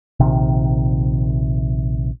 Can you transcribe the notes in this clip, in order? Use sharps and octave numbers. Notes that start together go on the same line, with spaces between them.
A#1 C3 D#3